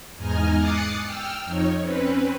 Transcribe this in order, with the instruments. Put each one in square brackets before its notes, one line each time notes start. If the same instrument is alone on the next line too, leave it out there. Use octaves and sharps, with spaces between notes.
[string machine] E2 G#2 D#4 D#5 G#5 F6
D6 D#6 F#6 A6 C7 C#7
G5 E6 F6
F2 D#4 C#5
C4 C#4 B4